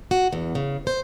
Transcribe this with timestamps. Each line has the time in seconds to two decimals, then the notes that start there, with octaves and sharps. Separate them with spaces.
0.11 F#4
0.33 E2
0.55 C#3
0.87 C5